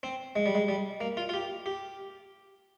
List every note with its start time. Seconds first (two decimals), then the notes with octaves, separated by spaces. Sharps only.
0.03 C4
0.36 G#3
0.46 G3
0.55 G#3
0.68 G3
1.01 A#3
1.17 F4
1.29 F4
1.34 G4
1.66 G4